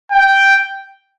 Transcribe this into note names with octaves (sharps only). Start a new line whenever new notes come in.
G5